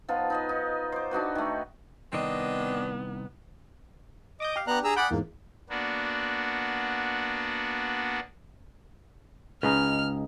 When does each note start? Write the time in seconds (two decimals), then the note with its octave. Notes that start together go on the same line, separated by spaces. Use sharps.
0.08 F3 B3 D#4 F4
0.30 D#4 B4 D#5
0.49 D#4
0.92 C5 D6
1.11 D4 D#4 F#4 B4
1.35 D#3 A3
2.13 C2 D#3 B3 C4 D4 D#5
4.40 D#5 D6 D#6 G6
4.56 G4 F5
4.67 B3 D4 G4 A#5 F#6
4.84 G#4 A#5 E6
4.96 G#4 D5 F#5 G5 B5
5.11 E2 G#2 A#3
5.70 A#3 B3 D4 F#4
9.63 C#2 C#4 D#4 G#4 B4 F6